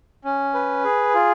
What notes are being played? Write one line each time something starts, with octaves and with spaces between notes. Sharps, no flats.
C#4
B4
G#4
F4